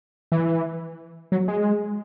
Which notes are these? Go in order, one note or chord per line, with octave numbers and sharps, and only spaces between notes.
E3
F#3
G#3